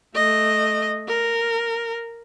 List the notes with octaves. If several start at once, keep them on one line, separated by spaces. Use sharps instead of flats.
A3 D#5
A#4